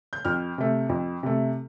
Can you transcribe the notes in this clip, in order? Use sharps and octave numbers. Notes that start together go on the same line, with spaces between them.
G6
F2 F6
C3 A3
F2
C3 A3